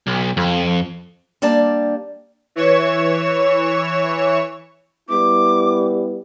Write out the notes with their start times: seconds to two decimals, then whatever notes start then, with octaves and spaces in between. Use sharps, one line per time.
0.07 B1
0.37 F2
1.42 G3 A#3 D4 D5 A5
2.56 E3 C#5 C#6 E7
5.09 G3 B3 E4 D6